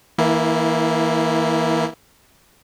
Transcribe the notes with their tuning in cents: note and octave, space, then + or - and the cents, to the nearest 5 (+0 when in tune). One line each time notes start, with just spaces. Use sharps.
E3 -30 A#3 +0 E4 +0